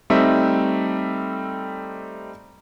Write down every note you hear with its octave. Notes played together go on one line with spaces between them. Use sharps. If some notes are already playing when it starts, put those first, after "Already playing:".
G3 A3 C4 D#4 E5